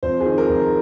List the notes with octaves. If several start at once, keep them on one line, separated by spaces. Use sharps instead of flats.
F2 C5
G#4
D#3
A#4
F2